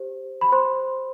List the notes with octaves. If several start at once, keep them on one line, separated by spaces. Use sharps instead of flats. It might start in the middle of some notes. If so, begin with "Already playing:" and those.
Already playing: G4 C5
B5
C5 C6